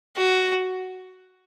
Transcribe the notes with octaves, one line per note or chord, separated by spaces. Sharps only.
F#4